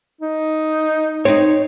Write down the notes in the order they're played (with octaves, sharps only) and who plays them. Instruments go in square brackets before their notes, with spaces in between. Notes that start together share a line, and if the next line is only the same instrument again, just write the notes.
[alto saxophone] D#4
[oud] C4 D#4 [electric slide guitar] C#5